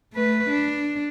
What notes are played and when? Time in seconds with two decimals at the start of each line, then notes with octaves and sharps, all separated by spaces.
0.13 A3 B4
0.50 D4